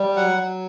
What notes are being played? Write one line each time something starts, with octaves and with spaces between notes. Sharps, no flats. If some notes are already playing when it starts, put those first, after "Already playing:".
Already playing: G3
F#3 F#5
F#3